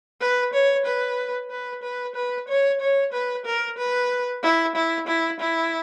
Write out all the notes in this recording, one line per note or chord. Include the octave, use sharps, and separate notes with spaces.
B4
C#5
B4
B4
B4
B4
C#5
C#5
B4
A#4
B4
E4
E4
E4
E4